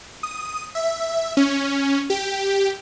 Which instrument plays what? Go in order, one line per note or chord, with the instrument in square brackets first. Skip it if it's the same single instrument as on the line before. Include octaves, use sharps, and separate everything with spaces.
[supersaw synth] D#6
E5
C#4
G4